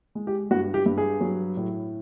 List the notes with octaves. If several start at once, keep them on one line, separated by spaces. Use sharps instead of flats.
G#3
G4
G2 F#4
G4
G2
G#4
F#3
A2